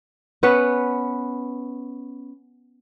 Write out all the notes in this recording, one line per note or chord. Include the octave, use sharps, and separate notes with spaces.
B3 C#4 B4